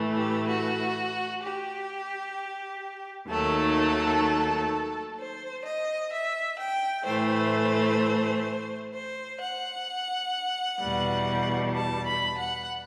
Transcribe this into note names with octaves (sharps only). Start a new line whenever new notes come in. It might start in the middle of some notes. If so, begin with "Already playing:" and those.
Already playing: A2 E3 A3
G4
F#4
G4
D#2 D#3 F#3 A3 A4
C5
D#5
E5
G5
A2 E3 A3 C5
C5
F#5
E2 B2 G3
A5
B5
F#5